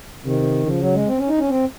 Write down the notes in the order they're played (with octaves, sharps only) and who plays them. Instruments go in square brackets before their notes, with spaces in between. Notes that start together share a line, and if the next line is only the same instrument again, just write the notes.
[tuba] C3 [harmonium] D#3
[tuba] C#3 [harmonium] F3
[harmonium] F#3
G#3
C4
C#4
D#4
C#4
C4